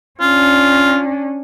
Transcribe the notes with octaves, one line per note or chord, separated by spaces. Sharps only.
C#4 D4 F4